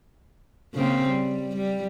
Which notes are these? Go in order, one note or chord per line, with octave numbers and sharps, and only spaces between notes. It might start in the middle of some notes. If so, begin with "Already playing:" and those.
C#3 A#3 C4
G3
G3